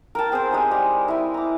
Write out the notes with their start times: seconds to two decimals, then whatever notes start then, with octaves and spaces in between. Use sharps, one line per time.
0.15 A#4 G5 A5
0.32 C4 G#4 A#4 C5
0.51 G#3 D#4 G4
0.71 G3 G#3 A#5 C6
1.08 E4 G#5
1.34 A#5 D6